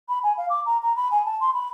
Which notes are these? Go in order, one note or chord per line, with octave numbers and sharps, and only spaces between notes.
B5
G#5
F5
D6
A#5
A#5
B5
G#5
A5
C6
B5